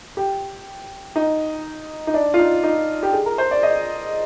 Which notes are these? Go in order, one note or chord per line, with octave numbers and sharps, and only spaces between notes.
G4
D#4
D#4
D4
F4
D#4
D#4
G4
G#4
A#4
C5
D5
D#5